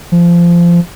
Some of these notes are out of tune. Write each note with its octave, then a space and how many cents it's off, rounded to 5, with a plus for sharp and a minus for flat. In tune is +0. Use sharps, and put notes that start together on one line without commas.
F3 -20